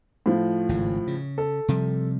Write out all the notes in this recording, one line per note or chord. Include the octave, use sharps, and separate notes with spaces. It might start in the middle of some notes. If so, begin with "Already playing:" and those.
A2 F3
G#1 C#3
C#3
A4
C3 F3 G3